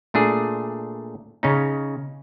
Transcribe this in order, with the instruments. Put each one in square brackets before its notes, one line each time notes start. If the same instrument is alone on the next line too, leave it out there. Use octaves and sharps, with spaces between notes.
[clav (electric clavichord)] A#2 A3 D4 G#4
C#3 C#4 D#4